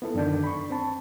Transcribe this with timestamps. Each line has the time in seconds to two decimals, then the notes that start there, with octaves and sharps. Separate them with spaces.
0.02 B3 E4 A4
0.15 F#2 D3 D#3 D4 G6
0.44 B5 C#6
0.70 C4 A5